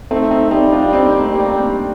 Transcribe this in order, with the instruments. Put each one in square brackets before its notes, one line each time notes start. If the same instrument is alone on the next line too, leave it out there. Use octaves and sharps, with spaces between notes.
[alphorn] A3 [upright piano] C4 D#4
[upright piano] C4 D#4
[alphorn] G3 [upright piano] C4 D#4
[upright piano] D4 F4
C4 D#4
A#3
A3
[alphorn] G3 [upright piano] A#3
[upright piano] D4
A3 C4